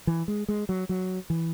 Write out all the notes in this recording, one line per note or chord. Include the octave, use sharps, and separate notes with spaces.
E3
G#3
G#3
F#3
F#3
E3